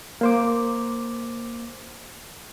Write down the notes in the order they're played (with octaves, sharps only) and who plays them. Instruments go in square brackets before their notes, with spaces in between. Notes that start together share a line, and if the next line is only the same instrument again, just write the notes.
[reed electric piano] A#3 C5 D6